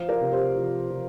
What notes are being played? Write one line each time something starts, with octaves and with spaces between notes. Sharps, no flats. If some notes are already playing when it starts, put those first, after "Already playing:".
Already playing: F3 C5 F5
A#4 D5
C3
G4 C5
F3
F3